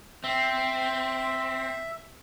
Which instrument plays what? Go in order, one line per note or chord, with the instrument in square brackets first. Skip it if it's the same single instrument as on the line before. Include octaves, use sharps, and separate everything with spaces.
[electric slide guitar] C4 [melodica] E5